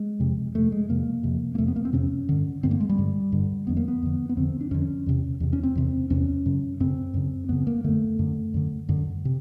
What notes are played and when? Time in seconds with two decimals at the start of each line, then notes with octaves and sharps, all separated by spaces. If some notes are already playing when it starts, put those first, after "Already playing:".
Already playing: G#3
0.20 F2 C3
0.54 F2 C3 A3
0.72 G#3
0.89 F2 C3 A#3
1.23 F2 C3
1.55 A#3
1.58 F2 C3 A3
1.68 B3
1.76 A#3
1.85 C4
1.93 F2 C3 C#4
2.29 G2 D3
2.63 G2 D3 C4
2.71 A#3
2.80 G#3
2.89 G3
2.98 G2 D3
3.32 G2 D3
3.67 F2 D3 B3
3.77 A#3
3.88 B3
4.02 F2 D3
4.29 B3
4.37 F2 D3 C4
4.61 D4
4.71 F2 D3 C#4
5.06 E2 C3
5.40 E2 C3
5.53 C#4
5.63 C4
5.75 E2 C3
6.10 E2 C3 C#4
6.46 F#2 C#3
6.80 F#2 C#3 C4
7.14 F#2 C#3
7.49 F#2 C#3 B3
7.67 A#3
7.84 F#2 D3 A3
8.19 F#2 D3
8.54 F#2 D3
8.89 F#2 D3
9.25 C3